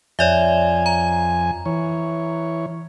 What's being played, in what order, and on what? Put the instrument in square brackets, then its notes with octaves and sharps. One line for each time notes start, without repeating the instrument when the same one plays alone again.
[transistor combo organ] F2 G#5 [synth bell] C#5 D5 E5
[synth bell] A#5
[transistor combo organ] E3 C#5